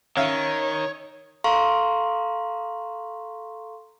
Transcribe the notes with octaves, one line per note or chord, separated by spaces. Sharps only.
D#3 C#4 C#5 E5 F5
A4 F5 A#5 C6 C#6